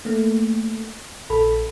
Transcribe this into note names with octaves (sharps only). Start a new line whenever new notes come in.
A3 A#3
A#1 A4 B5